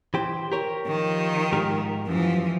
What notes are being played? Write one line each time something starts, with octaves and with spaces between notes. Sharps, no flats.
E3 G4 C5
G4 A#4 C#5
D#3 F3
G#2 G4 A#4
F#2 E3 F3